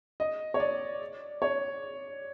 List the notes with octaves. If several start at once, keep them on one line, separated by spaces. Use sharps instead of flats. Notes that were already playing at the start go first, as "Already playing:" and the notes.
D#5
C#5
D5
C#5